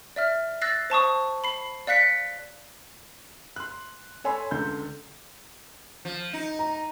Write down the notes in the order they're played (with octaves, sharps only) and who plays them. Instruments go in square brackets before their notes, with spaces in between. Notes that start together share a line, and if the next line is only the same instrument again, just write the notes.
[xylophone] D5 E5 F6
E6 F#6 A6 A#6 C7
C5 A5 C#6 D#6
B5 C7
D5 F5 F#6 B6 C#7
[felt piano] C6 F#6
A4 C#5 G#5 B5 C6 E6
C#2 D3 A4 C6 G6
[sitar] F3
D#4
[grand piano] A#5